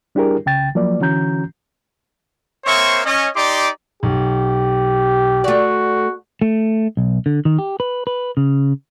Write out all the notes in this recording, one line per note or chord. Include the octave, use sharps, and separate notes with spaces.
G3 D4 E4 G4 G#4 A#4
C2 C#3 G5 A6
F3 F#3 A#3 D5
D3 E3 C#4 F#4 A#5 G6
A#3 C4 C5 C#5 E5 C#6
C#4 D#5
D#4 G4 D5 C6 D6
B1 G4
A3 F#4 D5
A3
B1
D3
D#3
G4
B4
B4
C#3